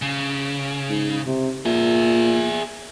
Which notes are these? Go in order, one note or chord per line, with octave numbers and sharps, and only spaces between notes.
C#3
G#2
C3
A#2 G#4 E5